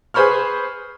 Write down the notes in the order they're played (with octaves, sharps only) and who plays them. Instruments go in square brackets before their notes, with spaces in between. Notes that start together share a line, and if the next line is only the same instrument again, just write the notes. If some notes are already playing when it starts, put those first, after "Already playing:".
[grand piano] G#4 B4 C5 B5 C#6 F6